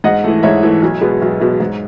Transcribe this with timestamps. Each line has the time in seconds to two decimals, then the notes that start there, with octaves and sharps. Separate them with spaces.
0.04 G#2 D#5 F#5
0.24 E3 A3
0.43 G#2 C#5 E5
0.63 E3 A3
0.82 B1
1.01 B2 G#3 B3
1.22 B1
1.41 B2 G#3 B3
1.60 G#2